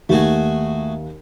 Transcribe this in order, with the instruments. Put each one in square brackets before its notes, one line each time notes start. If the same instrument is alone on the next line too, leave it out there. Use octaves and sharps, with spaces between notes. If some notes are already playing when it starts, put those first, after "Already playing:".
[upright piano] D#2 [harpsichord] A3 F#4 G#4